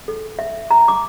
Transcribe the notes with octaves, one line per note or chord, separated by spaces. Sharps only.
A4
E5
A#5
D6